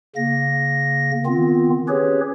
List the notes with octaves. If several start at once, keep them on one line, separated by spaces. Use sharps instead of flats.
C#3 A#3 A#6
D#3 B3 C4 F4
C#4 G4 G#4 B4 C#5